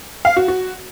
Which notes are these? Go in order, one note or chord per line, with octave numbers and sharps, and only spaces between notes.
F5
F#4
F#4